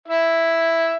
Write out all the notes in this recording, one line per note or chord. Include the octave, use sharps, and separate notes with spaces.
E4 E5